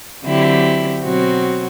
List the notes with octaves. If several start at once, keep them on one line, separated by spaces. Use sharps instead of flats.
D3 F#3 C4 E4 G4
B2 F#3 C4 F#4